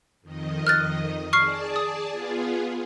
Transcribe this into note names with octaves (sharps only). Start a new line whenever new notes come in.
F2 D#3 D#5
F6 F#6 A6
G#4 D5 A5 C#6 F6 C7
D#6
B3 F4 G#4